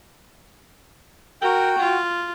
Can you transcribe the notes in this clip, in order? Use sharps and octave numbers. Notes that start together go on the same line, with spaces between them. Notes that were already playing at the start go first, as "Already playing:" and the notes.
F#4 A#4 G5
F4